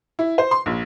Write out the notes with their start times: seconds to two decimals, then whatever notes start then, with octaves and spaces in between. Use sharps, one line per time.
0.19 E4
0.38 C5
0.51 C6
0.66 A#1